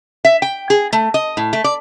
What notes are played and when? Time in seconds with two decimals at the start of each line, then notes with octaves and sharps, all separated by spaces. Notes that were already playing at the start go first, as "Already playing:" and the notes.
0.25 E5
0.42 G5
0.70 G#4
0.93 A3
1.14 D#5
1.37 A2
1.53 A3
1.64 D5